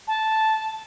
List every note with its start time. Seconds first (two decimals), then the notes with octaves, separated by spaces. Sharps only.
0.08 A5